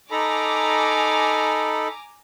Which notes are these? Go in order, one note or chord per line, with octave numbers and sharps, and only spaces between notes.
D#4 A4 G#5 A#5 B5 D6